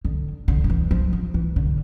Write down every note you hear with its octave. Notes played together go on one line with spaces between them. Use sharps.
D3
D3
D3
E3
F3
F3
E3
D3